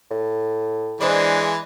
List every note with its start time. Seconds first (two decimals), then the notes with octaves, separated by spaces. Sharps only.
0.11 A2
1.01 E3 G#3 D4 C5 D5